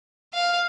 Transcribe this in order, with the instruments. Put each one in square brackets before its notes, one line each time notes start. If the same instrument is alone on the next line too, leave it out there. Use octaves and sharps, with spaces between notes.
[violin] F5